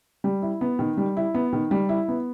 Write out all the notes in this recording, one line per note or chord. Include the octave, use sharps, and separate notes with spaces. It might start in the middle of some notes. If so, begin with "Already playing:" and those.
G3
E4
B3
D#3
G3
E4
B3
D#3
G3
E4
B3